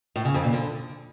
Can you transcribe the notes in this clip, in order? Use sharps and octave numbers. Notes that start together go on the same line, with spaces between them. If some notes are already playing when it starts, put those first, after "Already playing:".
A2
C#3
F2
A#2
D3